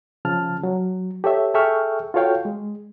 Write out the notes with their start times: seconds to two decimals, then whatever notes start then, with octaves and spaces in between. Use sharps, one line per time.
0.25 C#3 F3 A5 F6
0.63 F#3
1.24 G4 A4 C#5 E5
1.54 G#4 A4 E5 G5 C#6 F6
2.14 F4 F#4 A4 C#5 F5 G5
2.45 G#3